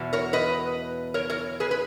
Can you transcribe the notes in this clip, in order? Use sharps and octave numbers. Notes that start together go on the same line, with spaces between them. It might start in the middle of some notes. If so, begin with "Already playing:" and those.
Already playing: E2 B2
A#4 C#5
B4 D#5
A#4 C#5
A#4 C#5
G#4 B4
B4